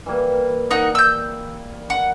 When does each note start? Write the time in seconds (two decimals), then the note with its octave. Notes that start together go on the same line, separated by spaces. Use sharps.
0.06 E3 G3 A#3
0.71 D#4 A#4 F#5
0.95 E6 G6
1.90 F#5 A#5